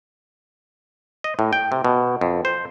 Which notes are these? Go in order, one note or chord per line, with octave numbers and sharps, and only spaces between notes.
D#5
A2
G5
C3
B2
F2
C5